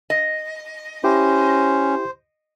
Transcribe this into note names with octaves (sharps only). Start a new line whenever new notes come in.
D#5
C#4 E4 G4 C5